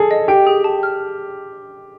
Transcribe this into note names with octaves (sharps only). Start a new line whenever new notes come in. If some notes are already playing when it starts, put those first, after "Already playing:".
Already playing: G#4 A4
D#5
G4 G5
G#4
A5
F6